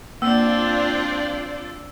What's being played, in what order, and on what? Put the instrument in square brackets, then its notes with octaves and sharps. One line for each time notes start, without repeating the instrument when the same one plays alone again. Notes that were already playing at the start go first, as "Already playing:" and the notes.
[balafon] A#3 [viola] C4 D4 [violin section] F4 D5 [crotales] E6